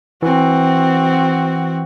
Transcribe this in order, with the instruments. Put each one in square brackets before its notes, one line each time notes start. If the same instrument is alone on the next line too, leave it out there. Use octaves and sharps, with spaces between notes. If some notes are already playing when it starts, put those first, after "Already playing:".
[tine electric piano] E3 [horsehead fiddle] C4 F#4